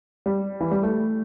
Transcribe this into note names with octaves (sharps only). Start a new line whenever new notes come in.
G3
E3
G3
A3